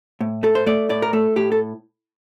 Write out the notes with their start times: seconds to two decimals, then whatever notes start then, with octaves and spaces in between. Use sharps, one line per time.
0.21 A2
0.43 A3 A4
0.55 C5
0.66 A3 D5
0.89 A2 D5
1.02 A#4
1.13 A3 A4
1.36 A2 G4
1.52 A4